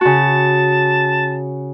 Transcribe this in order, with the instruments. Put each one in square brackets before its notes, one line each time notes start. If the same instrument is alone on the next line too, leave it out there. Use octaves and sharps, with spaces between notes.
[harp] C#3 F#4 [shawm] A5